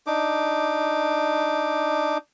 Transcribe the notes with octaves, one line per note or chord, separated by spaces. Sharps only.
D4 D#4 D6